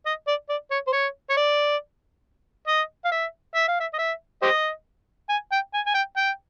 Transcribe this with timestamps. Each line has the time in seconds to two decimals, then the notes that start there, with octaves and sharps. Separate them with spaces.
0.06 D#5
0.27 D5
0.49 D5
0.71 C#5
0.87 C5
0.93 C#5
1.30 C#5
1.37 D5
2.68 D#5
3.05 F5
3.12 E5
3.55 E5
3.68 F5
3.80 E5
3.93 D#5
3.99 E5
4.42 G4 C5 D#5
5.30 G#5
5.52 G5
5.74 G#5
5.86 G#5
5.95 G5
6.17 G5